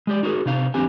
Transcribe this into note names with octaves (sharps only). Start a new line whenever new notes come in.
G#3 G4 D5
D#4 F#4 G#4 A#4
C3 D#4 F5
F2 D3 C4 G4 G#5